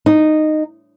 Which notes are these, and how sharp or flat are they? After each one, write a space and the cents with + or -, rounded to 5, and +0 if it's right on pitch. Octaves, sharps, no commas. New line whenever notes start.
D#4 -10